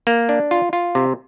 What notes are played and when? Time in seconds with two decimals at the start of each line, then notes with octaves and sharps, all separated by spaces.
0.07 A#3
0.29 D4
0.51 F4
0.73 F4
0.95 C3